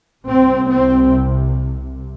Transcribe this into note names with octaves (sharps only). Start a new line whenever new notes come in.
C2 C3 C4
C4